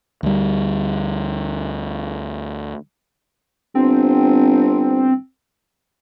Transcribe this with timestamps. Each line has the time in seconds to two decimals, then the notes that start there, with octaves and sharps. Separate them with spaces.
0.23 D2 G3
3.75 G1 C4